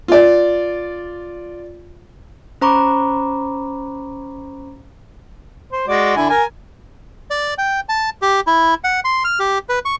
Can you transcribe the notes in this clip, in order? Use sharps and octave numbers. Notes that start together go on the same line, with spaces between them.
F4 D5
C#4 C5 A#5 B5 C#6 D6
C5
G#3 F#4 D5
D3 E4 G#5
A#4 G#5
D5
G5
A5
G4
E4
F#5
C6
F6
G4
B4
C#6